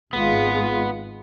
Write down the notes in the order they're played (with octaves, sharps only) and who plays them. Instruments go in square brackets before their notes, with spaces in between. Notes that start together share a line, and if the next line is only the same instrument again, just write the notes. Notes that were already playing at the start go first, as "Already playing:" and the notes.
[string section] G#1 G#3 F4 [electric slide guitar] B3